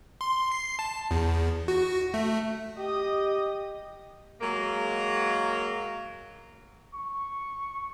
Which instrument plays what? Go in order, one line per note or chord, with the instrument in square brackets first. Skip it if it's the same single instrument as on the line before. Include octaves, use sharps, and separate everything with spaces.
[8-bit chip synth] C6
C7
A5
E2
F#4
A3
[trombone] G4 [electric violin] D#5 D#6
[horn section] F#3 G#3 A#3
[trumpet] C#6